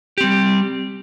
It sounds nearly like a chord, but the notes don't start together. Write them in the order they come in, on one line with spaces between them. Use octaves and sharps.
G4 C4 G3